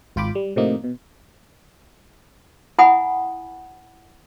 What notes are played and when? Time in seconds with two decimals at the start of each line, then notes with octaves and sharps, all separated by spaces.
0.16 G#1 F4 G5 B5 D6
0.35 G3
0.56 A2 C3 D#3 F3 A#3 D#4
0.84 B2
2.78 E4 F#5 G#5 B5 D#6